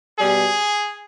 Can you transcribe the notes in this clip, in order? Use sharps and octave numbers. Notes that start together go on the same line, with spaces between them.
B2 G3 G#4